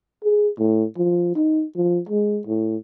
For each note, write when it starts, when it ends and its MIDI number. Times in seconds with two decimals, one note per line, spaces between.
0.24 0.49 68
0.59 0.85 45
0.97 1.32 53
1.36 1.64 63
1.76 2.00 53
2.09 2.41 56
2.47 2.77 45